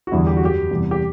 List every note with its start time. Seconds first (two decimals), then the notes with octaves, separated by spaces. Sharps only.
0.07 F#4
0.12 E2 D3 G3 E4
0.27 G4
0.37 F#4
0.41 F#2 F#3 G4
0.71 E2 C3 E3 G3
0.91 G4